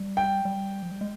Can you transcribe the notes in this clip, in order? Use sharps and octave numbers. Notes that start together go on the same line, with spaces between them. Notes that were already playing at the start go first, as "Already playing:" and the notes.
Already playing: G3
G5
G3
F3
G3
G#3